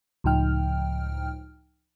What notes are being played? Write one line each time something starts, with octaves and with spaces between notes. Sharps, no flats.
C#2 A2 F3 D#4 G5 F6